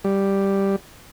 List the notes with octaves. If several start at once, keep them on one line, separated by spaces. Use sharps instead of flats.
G3